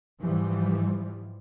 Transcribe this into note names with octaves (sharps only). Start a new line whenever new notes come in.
G#2 E3 F3 G3